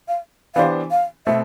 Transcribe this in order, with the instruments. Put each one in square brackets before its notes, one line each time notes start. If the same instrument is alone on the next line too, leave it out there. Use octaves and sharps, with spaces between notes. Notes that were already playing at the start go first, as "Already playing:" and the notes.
[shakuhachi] F5
[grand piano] E3 B3 D4 G4 C5 [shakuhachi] F5
[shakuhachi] F5
[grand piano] B2 A3 C4 [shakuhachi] E5